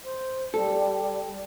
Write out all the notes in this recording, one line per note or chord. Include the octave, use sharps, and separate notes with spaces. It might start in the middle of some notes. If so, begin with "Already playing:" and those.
C5
G3 A4